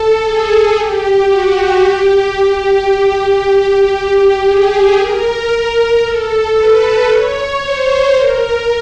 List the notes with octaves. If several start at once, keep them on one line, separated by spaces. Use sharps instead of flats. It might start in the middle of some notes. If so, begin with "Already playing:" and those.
Already playing: A4
G#4
G4
F#4
G4
G4
G4
G#4
A#4
A#4
A4
B4
C#5
C5
A#4